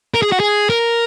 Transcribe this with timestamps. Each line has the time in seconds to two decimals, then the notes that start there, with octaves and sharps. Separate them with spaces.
0.14 A#4
0.22 G#4
0.32 F#4
0.40 G#4
0.70 A#4